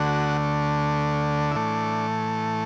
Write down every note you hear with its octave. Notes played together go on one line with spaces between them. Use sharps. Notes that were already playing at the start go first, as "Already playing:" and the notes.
Already playing: D2 D3 A3 F#4
E4
A2 E3 A3 D4